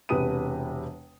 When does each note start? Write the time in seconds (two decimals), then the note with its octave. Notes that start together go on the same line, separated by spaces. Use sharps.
0.09 E1 C3 B4 D#6 D#7